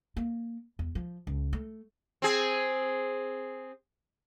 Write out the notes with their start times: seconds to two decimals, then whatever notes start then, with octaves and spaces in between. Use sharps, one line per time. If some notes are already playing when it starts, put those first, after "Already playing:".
0.17 A#3
0.79 E2
0.95 F3
1.27 C#2
1.53 A3
2.22 C4 G#4